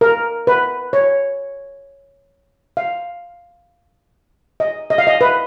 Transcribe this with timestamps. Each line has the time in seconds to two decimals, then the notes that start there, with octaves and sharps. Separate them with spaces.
0.01 A#4
0.47 B4
0.93 C#5
2.77 F5
4.60 D#5
4.90 D#5
4.98 F5
5.07 D#5
5.21 B4